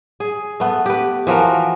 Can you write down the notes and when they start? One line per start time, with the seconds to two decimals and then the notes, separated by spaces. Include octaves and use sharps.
0.20 G#4
0.60 A3 B3
0.86 G4 B4
1.27 E3 F3 F#4 A#4